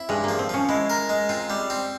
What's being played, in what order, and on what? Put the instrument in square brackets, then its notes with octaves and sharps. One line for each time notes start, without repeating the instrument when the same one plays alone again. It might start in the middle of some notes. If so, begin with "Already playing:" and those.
Already playing: [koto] C4 [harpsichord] E4
[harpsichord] G2 [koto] G#3
[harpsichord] F3 [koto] A#3
[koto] C4
[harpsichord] F3 [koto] C#4
[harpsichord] G#3 [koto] E4
[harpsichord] A#4
G#3
[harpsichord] C4 [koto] F4
[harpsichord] G3
C4